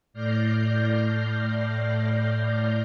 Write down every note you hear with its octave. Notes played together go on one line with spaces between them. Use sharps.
A2 D5 F6 G6 A#6 C7